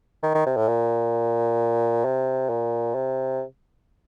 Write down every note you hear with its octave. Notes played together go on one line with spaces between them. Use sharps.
D#3
D#3
C3
A2
A#2
C3
A#2
C3